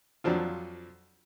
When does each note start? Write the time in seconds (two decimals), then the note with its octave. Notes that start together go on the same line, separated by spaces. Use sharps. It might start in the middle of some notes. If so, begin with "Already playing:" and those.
0.24 F2 F3 F#3 D4 F4